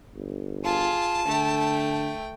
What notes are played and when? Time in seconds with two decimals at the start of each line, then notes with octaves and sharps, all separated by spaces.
0.14 G1
0.64 F4 G#4 A5
1.28 D3 A3 G5